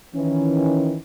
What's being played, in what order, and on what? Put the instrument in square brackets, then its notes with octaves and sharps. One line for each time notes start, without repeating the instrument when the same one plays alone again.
[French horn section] D#3 E3 C#4